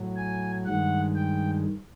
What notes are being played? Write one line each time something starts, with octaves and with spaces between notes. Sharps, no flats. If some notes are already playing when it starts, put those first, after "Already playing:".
Already playing: A2 F#3
G#5
G2 D#3 G#3 F#5
G5